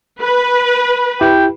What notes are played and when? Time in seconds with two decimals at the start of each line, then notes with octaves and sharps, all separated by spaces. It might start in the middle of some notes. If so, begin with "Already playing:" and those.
0.21 B4
1.21 E4 G4 G5